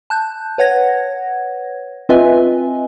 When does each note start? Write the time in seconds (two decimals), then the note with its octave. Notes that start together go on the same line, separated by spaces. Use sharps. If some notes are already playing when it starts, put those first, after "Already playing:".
0.10 A5 F#6 G6
0.58 B4 C#5 F#5 G#6 A#6
2.09 C4 F4 B4 D#5 E5 G#5